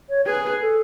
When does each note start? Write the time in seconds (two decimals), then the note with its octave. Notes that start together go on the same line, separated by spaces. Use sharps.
0.09 C#5
0.26 G#4 B4
0.43 B4
0.61 A4